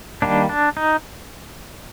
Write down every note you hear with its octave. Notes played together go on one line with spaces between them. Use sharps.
D#3 G3 A#3 D4
D4
D#4